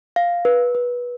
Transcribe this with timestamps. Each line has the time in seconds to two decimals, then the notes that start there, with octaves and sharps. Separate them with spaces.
0.16 F5
0.45 B4
0.75 B4